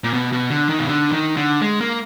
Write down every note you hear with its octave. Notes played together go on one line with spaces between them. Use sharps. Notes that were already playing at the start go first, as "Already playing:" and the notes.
A#2
B2
B2
D3
D#3
B2
D3
D#3
D3
G#3
A#3